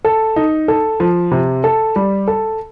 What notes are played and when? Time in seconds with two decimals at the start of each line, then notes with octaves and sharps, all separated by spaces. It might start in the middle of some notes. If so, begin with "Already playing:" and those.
0.05 A4
0.36 D#4
0.68 A4
1.00 F3
1.32 C3
1.64 A4
1.96 G3
2.28 A4